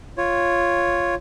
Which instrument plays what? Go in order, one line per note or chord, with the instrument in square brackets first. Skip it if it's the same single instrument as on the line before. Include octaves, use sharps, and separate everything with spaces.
[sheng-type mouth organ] F4 C#5